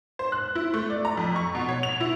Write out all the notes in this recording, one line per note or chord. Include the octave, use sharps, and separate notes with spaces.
C5
F#6
E4
A3
D5
A#5
F2
C#6
B2
C#5
F7
E4